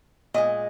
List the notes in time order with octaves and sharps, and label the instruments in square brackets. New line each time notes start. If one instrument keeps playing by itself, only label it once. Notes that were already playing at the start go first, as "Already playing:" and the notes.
[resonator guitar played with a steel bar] A#2 G#3 D#5